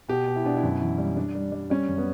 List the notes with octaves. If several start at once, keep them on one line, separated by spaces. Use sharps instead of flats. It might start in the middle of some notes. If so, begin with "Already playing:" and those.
B2 G4
B2
E4
B2 D4
E4
F#2
E3
G3
G3 D4
G3
G3
G3 C#4
F#2
B3